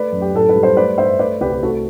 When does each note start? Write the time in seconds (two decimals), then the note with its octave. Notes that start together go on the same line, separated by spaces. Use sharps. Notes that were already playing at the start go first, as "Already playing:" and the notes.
Already playing: A3 B4 D5
0.12 F#2
0.21 G4
0.34 A2 A4
0.49 B4
0.56 G3
0.63 C5
0.76 A3 B4 D5
0.98 G2 C5 E5
1.19 A3 B4 D5
1.41 C2 G4 B4
1.52 G4
1.63 A3 F#4 A4